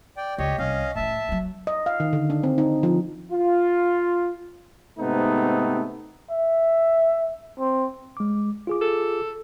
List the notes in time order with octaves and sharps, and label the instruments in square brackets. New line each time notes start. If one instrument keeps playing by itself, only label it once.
[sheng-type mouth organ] D5 G5
[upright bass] C#2 [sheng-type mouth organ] G4 C#5 D#5
[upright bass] C2 [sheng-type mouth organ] C#4 D#5 F5
[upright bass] A2 E3 [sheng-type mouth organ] E5 A5
[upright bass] F3 F#3
[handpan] D#5
F5
D#3
D3
D4
C4
D#4
F3
[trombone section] F4
G#2 C3 A3 B3 C4 D#4
[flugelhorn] E5
C4
[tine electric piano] G#3 D6
F4 G#4 D6
[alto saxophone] A4